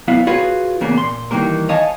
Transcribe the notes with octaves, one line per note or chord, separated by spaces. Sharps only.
C2 F#2 B3 E4 F5
F4 F#4 G#4 B4 C#5 F5
E2 C#3 A#3 B3
A#2 C6
D#3 E3 G3 A#3 A#4
C#5 D#5 F5 G#5 A5